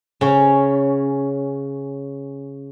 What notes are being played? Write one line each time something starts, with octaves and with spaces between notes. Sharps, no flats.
C#3 C#4